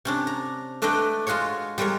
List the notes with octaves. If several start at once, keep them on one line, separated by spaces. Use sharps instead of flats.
C3 C#4 D4
A#5
A3 D4 B4 D5 D#5 G5
G#3 F4 F#4 G#4 C#5
G3 G#3 B3 A#4 C#5